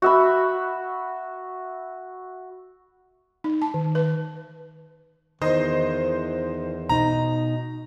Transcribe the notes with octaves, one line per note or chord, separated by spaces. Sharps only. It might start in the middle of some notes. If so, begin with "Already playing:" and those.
F#4 E5 B5
D#4
A5
D#3
B4
E2 D#3 C5 D#5
B2 D#4 A#5